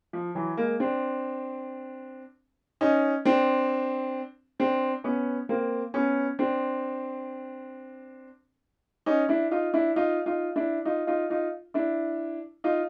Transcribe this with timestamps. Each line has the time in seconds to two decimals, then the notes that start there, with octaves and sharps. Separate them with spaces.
0.13 F3
0.35 E3 F#3
0.57 G#3 A#3
0.80 C4 D4
2.81 C#4 D#4
3.25 C4 D4
4.59 C4 D4
5.04 B3 C#4
5.49 A#3 C4
5.94 B3 C#4
6.39 C4 D4
9.06 C#4 D#4
9.29 D4 E4
9.51 D#4 F4
9.74 D4 E4
9.96 D#4 F4
10.26 D#4 F4
10.56 D4 E4
10.85 D#4 F4
11.07 D#4 F4
11.30 D#4 F4
11.74 D4 E4
12.64 D#4 F4